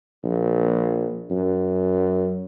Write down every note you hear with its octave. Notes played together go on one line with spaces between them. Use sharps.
A#1
F#2